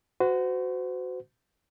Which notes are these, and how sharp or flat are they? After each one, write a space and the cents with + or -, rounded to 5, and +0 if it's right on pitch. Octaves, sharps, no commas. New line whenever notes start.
F#4 +0 C5 -40